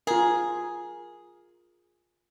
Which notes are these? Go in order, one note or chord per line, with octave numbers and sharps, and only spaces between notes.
F4 G#4 A#4